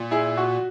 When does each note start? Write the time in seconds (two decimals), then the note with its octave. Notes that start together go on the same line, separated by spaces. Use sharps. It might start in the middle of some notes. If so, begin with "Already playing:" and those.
Already playing: A#2
0.11 E4 G#4
0.37 F#4